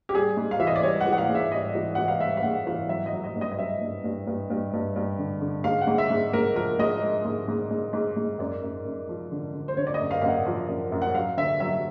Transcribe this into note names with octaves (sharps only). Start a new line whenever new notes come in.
G4
G3 G#4
G#2
F5
E3 E5
D#5
D5
G3 C#5
F#5
E3
F#5
F5
G#2
E5
G3 D#5
E3
E3 F#5
F5
G3 E5
F5
G#2 F#5
E3 F5
F#3 E5
D#5
F#3
D#5
G2
D#5
D#5
F#3 E5
G2
G2
G2
G2
G2
G2
D3
D3
G#2 F5
F#5
G#2
E5
G#2
G#2 A#4
F3 A#4
G#2 D#5
G#3
G#2
G#2
G#2
G#2
G#2
F#2 D5
F#2
F#2
F3
D3
D3
C5
D3 C#5
D5
D#5
F#2
F5
F#2 F5
F#5
F3
F#2
F#2
F#5
F#3 F5
D3 E5
F#3 E5